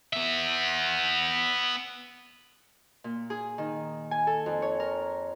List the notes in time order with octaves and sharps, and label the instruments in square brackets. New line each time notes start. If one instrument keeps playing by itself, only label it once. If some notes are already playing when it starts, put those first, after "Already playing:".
[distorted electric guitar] B3 E5
[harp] A#2
G#4
D#3
G#5
A4
F2
C#5
A#4